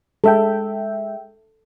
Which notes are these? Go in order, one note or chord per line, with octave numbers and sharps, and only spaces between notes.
G#3 A4 E5 G5